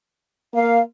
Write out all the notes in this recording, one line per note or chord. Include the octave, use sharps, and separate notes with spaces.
A#3 F5